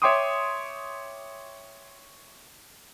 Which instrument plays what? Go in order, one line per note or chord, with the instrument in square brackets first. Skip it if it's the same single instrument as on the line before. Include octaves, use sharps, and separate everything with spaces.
[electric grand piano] C#5 E5 G5 C6 D6 D#6